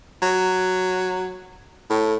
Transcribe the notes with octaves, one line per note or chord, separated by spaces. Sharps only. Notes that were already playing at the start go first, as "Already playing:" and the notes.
F#3
A2